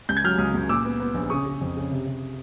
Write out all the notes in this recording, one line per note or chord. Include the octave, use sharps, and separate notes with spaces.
C#2 G6
G#6
F#3 F6 G6
C#2 D#6 F6
C#2
A#2 D6 E6
B3
B3
A#1
C#3 C#6 D#6
C#3
F2
C#3
C3
C3